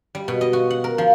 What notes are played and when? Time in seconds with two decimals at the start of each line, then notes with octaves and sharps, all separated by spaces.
0.15 G3
0.28 B2
0.41 D#5
0.53 F#4
0.70 F#5
0.84 A#4
0.98 F3